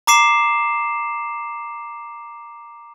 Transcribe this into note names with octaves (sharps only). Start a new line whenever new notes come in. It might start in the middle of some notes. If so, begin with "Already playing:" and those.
A#5 D6 C7 E7